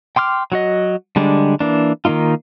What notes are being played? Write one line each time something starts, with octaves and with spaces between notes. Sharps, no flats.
G5 C6 D6 F6
F#3 F#4 D#5
D3 G3 G#3 D4
E3 A#3 D4
D#3 A3 A#3 D#4 F4